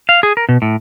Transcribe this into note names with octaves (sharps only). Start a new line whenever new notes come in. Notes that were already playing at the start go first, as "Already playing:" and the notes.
F5
G#4
A#4
B2
A2